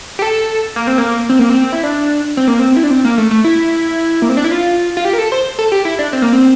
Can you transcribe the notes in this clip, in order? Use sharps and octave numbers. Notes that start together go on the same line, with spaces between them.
G4
A4
A#3
C4
A#3
C4
A#3
C4
E4
D4
C4
A#3
C4
E4
D4
C4
A#3
A3
A3
E4
A#3
C4
D4
E4
F4
F4
G4
A#4
A4
C5
A4
G4
E4
D4
C4
A#3
C4